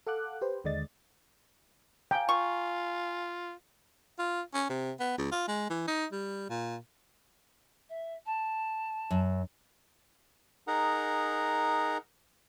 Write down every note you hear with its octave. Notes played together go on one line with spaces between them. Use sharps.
A4 F5 F#5 D6 F#6
G4 B4 C5
D#2 D3 G#3 D5 D#5 A6
F5 G5 G#5 A#5
F4 C#6
F4
C#4
C3
B3
C#2
F4
G#3
E3
D#4
G3
A#2
E5
A5
F#2
D#4 G#4 A#4 F#5 A#5